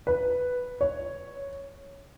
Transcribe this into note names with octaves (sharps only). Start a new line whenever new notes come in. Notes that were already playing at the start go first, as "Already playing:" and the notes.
B4
C#5